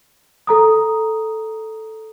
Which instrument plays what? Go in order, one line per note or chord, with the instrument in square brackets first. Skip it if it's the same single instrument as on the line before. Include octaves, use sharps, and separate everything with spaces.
[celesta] A4 A#5 D#6